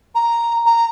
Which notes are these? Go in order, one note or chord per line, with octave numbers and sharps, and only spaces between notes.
A#5
A#5